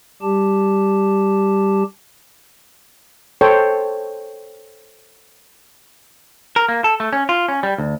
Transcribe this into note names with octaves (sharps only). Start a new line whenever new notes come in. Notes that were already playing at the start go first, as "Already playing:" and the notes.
G3 G4 A5
A4 C5 C#5 G5
A#4
A#3
A4
A3
C#4
F4
C#4
G3
D2